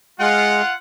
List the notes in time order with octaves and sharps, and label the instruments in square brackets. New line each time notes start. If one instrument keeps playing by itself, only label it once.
[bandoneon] G#3 [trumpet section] F4 F#5